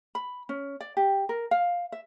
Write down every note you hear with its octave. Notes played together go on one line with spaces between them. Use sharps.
B5
C#4
D5
G4
A#4
F5
E5